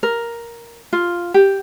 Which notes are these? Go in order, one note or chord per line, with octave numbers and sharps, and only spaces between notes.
A#4
F4
G4